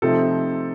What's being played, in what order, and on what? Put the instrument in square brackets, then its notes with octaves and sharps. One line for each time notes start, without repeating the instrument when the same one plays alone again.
[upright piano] C3 F3 A3 C4 D#4 A4